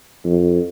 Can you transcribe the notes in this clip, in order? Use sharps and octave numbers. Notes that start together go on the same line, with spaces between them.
F2